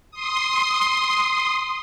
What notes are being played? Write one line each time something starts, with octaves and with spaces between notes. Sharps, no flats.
C6 D#6